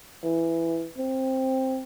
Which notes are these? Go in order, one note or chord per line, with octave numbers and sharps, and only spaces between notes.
E3
C4